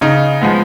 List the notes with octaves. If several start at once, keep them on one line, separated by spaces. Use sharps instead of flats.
C#3 D#4
F3 G#3 B3